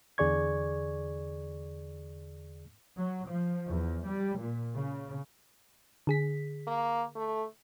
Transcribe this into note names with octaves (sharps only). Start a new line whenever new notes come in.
E2 D3 G#4 D5 C#6 G#6
F#3
F3
E2
G3
A#2
C#3
D3 G#4 B6
A#3
A3